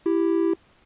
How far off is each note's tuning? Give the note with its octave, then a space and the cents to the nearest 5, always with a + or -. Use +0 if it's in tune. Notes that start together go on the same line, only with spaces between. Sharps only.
E4 +10 G4 +0